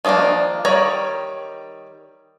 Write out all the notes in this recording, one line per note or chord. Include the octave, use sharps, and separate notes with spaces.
D#3 F3 A3 A#3 D4
D#3 G3 C#5 A#5 B5